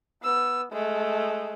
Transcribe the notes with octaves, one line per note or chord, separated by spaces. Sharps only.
B3 E6
G#3 A3